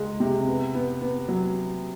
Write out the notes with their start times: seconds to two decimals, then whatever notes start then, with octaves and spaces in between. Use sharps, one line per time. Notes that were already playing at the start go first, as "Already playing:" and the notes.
Already playing: C#2 G#3
0.20 C3
0.47 B3
0.75 B3
1.01 B3
1.28 F#3